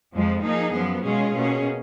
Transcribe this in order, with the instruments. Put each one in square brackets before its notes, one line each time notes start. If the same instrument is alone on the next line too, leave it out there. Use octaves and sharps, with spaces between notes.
[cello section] F2 F3 G#3
F3 A#3 D#4 G#4
F#2 F3 B3
B2 G#3 C#4 F4 G#4
B2 A#3 C#4 G#4